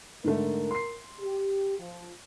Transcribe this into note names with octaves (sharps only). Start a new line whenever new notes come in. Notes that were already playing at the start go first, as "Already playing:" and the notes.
G#2 D3 A3 A#4
C6 C7
G4
F3